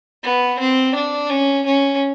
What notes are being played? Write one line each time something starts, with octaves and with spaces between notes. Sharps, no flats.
B3
C4
D4
C#4
C#4